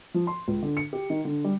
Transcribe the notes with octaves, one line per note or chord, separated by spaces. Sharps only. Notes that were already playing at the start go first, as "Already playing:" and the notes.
F3
C6
C#2
D3
C#7
G4
D#3
D3
G3